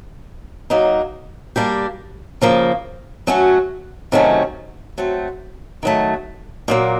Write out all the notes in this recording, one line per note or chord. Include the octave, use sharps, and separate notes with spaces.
F#3 A#3 D#4
G3 A#3 D4 G4
C#3 F3 A#3
F#3 A3 C#4 F#4
C3 D#3 F#3 A3 C#4
F#3 A3 C4
D#3 F#3 A3
A#2 F#3 A#3